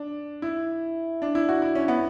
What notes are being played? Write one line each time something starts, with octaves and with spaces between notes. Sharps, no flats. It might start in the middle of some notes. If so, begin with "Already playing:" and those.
Already playing: D4
E4
D4
E4
F#4
E4
C#4
B3